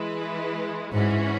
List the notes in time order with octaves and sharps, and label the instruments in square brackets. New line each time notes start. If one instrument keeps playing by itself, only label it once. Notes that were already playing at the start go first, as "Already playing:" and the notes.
Already playing: [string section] E3 G#3 E4 B4
[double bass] G#2 [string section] E3 C#4 F#4